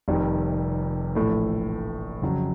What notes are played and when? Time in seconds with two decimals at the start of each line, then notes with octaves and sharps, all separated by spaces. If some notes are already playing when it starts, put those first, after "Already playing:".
0.08 F1 F2 C3 D#3 G3
1.15 A#1 A2 E3 A3
2.22 F2 C#3 F#3